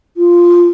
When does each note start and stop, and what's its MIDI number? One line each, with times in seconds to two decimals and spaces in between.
0.17 0.68 65